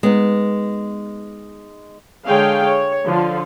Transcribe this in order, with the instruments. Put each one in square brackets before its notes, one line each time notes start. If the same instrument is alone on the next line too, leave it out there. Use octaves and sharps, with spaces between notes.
[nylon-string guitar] G#3 B3 D#4
[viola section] D3 G#3 G#4 C#5 F5 G5
C#5
D3 F3 F4